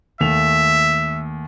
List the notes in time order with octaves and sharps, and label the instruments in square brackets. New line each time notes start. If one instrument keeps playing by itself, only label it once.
[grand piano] D#2 A3 F7 [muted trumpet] E5